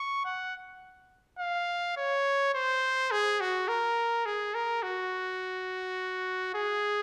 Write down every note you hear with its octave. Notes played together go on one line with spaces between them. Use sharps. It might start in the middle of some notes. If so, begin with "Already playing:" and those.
Already playing: C#6
F#5
F5
C#5
C5
G#4
F#4
A#4
G#4
A#4
F#4
G#4